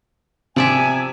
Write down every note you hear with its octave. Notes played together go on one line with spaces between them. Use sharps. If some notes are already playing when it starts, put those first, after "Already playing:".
C3 F3 D5 E5 G#5